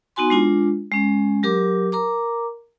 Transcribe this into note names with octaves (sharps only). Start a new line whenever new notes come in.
B3 D#4 F#4 G#5 C6
G#3 D4 F4
G#3 C#4
F#3 G4 A#4 D6
A#4 A#5 D6